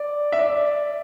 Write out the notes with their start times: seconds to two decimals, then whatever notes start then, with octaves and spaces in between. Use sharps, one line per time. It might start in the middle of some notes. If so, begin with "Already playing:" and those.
Already playing: D5
0.32 E5
0.39 D5